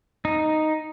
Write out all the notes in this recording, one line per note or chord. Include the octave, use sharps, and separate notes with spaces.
D#4